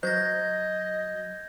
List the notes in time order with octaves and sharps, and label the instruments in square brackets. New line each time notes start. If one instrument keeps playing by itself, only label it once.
[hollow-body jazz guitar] F#3 [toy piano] C5 [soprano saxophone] D#5 [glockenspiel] G6 G#6 A#6